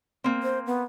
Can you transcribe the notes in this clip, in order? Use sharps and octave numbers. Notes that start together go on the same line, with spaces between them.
A#3 C4
C5
B3